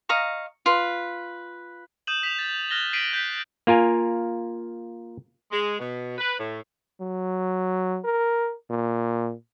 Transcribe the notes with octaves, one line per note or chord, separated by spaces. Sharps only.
D#5 F5 A#5 C#6
F4 B4
D#6 G6 D#7 E7 F#7
D#6 B6 E7 F7
A6
F6 F#6 A6 A#6 F7 G7
B6 C7 D7 D#7 F#7 G7
G6 B6
A#3 F4 A#4 G#5
G#3
B2
B4
A2
F#3
A#4
A#2